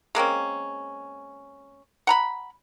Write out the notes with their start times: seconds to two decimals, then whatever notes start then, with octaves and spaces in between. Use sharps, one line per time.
0.15 G#3 A#3 C4 C#4
2.07 F#5 A#5 B5